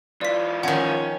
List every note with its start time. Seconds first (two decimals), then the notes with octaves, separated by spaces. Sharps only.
0.21 E3 F4 D5 B6
0.63 D#3 F3 C#4 F#5 G#6